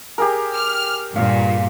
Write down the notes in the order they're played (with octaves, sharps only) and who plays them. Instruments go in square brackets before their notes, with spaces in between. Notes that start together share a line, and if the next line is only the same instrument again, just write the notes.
[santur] G4 G#4 A#4
[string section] F6
[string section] G2 A#2 [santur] F5